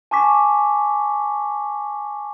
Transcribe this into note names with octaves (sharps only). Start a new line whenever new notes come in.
G#5 A5 C#6 D6 B6